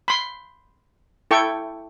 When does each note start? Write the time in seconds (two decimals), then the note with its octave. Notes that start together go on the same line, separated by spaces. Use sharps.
0.08 B5 C6
1.31 E4 A4 G5 C#6